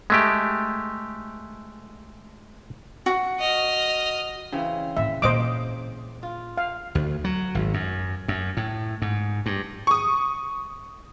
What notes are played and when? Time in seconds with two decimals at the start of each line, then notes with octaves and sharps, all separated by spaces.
0.10 G#3 A3 G4
3.06 F#4
3.39 D#5 F6
4.52 C#3 E3 C4
4.97 A2 E5
5.22 A#2 C#4 C5 D#5 D6
6.23 F4
6.57 F5
6.95 D2
7.24 F#3
7.55 G#1
7.74 F#2
8.28 F#2
8.57 A2
9.02 G#2
9.46 G2
9.87 C#6 D#6